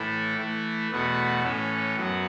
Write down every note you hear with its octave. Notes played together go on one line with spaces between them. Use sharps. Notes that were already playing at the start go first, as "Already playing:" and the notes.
Already playing: A2 E3 A3 E4 A4
E3 A3 E4
E2 B2 A3 F#4 B4
A2 E3 C#4 A4
F#2 F#3 B3 F#4